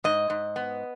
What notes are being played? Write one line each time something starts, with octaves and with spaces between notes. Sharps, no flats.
G#2 D#5
G#2
B3